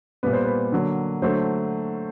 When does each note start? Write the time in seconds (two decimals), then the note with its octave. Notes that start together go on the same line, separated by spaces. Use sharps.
0.23 A#2 G3 B3 B4
0.33 C5
0.44 B4
0.72 D3 F#3 A#3
1.22 D3 F#3 A3 C5